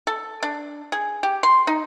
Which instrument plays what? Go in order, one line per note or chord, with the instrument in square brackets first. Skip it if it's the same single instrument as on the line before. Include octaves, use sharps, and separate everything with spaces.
[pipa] A4
D4
G#4
G4
C6
D#4